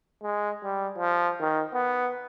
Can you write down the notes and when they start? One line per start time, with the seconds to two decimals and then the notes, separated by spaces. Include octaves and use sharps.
0.23 G#3
0.64 G3
0.98 F3
1.40 D#3
1.74 B3